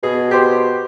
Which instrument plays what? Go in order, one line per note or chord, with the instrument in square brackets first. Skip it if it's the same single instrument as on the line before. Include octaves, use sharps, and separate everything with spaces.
[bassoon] B2 [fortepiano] G#4
[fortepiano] G4 C5